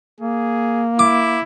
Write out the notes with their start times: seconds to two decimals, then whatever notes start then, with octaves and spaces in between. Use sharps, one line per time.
0.20 A#3 G#4
0.99 E4 D6